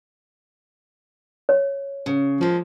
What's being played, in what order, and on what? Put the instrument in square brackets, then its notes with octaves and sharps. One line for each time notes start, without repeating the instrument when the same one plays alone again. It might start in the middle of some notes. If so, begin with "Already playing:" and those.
[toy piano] C#5
[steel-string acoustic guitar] C#3
[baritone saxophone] F3 [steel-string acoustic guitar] G#3 A#3